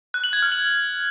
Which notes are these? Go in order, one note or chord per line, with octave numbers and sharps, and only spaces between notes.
F#6
F#7
G#6
F6
F#7